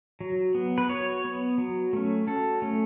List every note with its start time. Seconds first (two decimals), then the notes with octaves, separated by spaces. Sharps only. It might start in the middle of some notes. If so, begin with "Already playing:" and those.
0.20 F#3
0.55 B3
0.78 B4
0.89 F#3 C#5
1.24 B3
1.58 F#3
1.93 A3 C#4
2.27 F#3 A4
2.62 A3 C#4